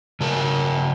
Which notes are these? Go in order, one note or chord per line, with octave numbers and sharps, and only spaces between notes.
C#3 A#4 C#5